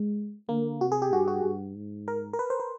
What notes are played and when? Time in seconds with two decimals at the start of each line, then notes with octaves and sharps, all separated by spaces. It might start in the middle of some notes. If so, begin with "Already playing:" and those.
Already playing: G#3
0.49 D3 A#3
0.81 C3 F#4
0.92 G#4
1.02 G4
1.13 G2 F#4
1.28 F#4
1.44 G2
1.76 G#2
2.08 A#4
2.33 A#4
2.39 B4
2.50 C5
2.60 B4